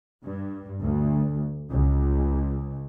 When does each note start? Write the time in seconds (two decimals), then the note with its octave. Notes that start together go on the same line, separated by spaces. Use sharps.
0.23 G2
0.82 D2
1.71 C#2